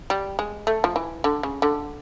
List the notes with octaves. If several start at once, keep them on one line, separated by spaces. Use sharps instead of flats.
G3
G#3
A3
F3
E3
D3
C#3
D3